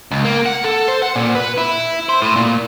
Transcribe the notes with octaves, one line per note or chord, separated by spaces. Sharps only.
C#2
A#3
F#5
A4
C5
F#5
A#2
B4
E4
C5
A2
A#2